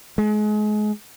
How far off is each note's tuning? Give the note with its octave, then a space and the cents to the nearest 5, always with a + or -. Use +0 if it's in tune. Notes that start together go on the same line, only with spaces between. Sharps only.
G#3 +30